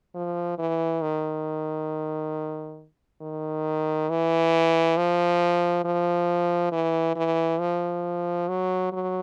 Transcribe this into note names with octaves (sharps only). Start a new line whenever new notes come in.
F3
E3
D#3
D#3
E3
F3
F3
E3
E3
F3
F#3
F#3